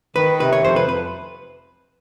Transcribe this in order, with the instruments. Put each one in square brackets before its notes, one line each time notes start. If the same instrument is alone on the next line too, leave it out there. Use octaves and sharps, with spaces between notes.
[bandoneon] D#3 [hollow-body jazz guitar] B4
[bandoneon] C3 [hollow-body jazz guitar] B4
[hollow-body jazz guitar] C#5
[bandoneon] F2 [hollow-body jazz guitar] C5
[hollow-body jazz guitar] B4
B4